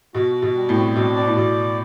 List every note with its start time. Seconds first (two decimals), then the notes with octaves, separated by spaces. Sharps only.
0.14 B2 F#4
0.35 F#4
0.42 B2
0.55 G3
0.69 A2
0.76 C4
0.96 B2 D4
1.16 D5
1.27 A2
1.36 B2 D5